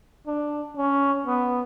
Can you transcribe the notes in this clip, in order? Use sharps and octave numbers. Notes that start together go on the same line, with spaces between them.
D4
C#4
B3